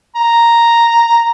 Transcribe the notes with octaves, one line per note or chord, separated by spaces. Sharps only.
A#5